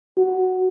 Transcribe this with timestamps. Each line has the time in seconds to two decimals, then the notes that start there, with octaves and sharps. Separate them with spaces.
0.17 F#4